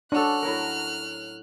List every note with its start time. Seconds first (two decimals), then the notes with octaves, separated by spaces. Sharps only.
0.12 C#4 D4 F#4 A4 F6 F#6
0.43 A2 F#3 A#4